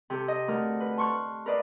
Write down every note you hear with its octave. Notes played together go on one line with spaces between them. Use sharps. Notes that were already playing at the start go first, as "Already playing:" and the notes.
C3 G4 A4
D#5
D2 A#4 F6
B4
A5 C6 C#6 F6 F#6
A#4 B4 D5 D#5 F5